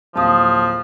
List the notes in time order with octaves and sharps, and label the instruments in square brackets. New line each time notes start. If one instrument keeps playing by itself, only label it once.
[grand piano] D1 A#3 [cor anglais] F3 [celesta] A5 D#6